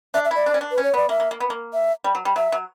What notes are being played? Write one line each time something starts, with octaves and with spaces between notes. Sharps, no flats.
D4 E5
E5
E4 D5
D4
C#4
D4
B4
C#4
C#5
B3 D5
A#3 E5
A#3
A#3
B3
A#3
E5
G3
F#3
G3
F#3 E5
F#3